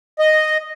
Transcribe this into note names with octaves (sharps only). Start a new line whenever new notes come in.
D#5